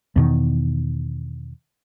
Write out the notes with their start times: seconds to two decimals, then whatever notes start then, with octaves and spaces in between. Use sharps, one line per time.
0.16 E2 B2 D#3